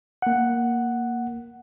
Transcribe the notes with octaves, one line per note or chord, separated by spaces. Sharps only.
A#3 F#5